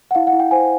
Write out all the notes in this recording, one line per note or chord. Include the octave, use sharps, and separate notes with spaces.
F#5
E4 F5
F#5
E4
G5
C5 G#5